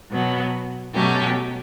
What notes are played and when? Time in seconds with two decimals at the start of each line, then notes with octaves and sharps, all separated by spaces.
0.10 B2 F#3 B3
0.94 B2 F#3 A3 C#4 G4